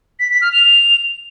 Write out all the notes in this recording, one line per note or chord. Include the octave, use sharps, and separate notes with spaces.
B6
B6
F6
F7